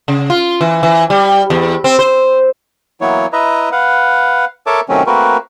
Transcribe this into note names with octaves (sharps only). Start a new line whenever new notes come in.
C#3
F4
E3
E3
G3
E2
C4
C5
E3 F#3 A#3 B3 E4 C#5
E4 B4 D#5 E5 A#5
B4 F5 F#5
A4 A#4 C#5 E5 A5 D6
C3 D#3 F#3 A3 C4 C#4
A3 A#3 C4 F#4 A#4 B4